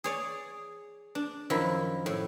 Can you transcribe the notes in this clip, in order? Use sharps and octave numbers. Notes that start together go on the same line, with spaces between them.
G#4 C#5 D5
D4
F#2 D#3 F3 E4
A2